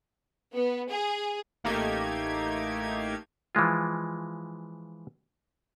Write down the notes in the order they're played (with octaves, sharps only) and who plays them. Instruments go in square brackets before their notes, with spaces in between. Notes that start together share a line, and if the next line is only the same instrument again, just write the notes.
[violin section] B3
G#4
[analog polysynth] A1 A3 A#3 D#4 G4 G#6
[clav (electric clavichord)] E3 F3 G#3 F4